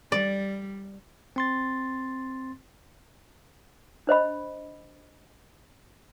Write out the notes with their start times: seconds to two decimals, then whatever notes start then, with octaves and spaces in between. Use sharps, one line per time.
0.12 G3 D5
1.36 C4 C6 A6
4.07 D4 C5 D#5 B5